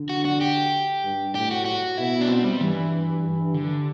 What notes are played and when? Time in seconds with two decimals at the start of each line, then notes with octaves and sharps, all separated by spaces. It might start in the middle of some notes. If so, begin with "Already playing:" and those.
Already playing: D3
0.09 F#4
0.25 F#4
0.41 G4
1.03 G2
1.35 A2 G4
1.51 F#4
1.66 F#4
1.98 B2 E4
2.21 D4
2.29 C4
2.44 G3
2.60 G2 E3
2.92 G2
3.23 G2
3.54 D3